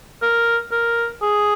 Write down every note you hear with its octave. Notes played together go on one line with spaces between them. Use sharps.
A#4
A#4
G#4